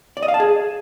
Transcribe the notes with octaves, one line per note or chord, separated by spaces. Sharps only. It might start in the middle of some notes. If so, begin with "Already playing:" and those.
D5
D#5
F5
A5
G#4